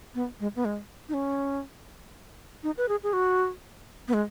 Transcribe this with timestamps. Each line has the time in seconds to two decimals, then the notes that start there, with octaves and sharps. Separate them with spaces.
0.15 B3
0.40 G#3
0.56 B3
0.65 G#3
1.09 D#4
1.14 C#4
2.63 D#4
2.77 B4
2.89 G#4
3.03 G#4
3.13 F#4
4.08 B3
4.14 G#3